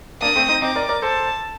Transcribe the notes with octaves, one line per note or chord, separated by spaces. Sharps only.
A#3 D4 D#6
A3 C4
C4 D#4
C4 D#4 D6
A#4 D5
A#4 D5
A4 C5 A5